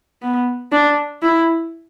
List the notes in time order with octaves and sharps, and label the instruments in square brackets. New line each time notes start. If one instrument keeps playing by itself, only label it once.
[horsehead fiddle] B3
D4
E4